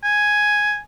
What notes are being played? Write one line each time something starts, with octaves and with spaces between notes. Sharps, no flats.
G#5